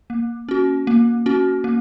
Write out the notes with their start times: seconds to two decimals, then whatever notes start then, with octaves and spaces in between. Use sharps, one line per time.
0.10 A#3
0.49 C#4 F#4
0.87 A#3
1.26 C#4 F#4
1.64 A#3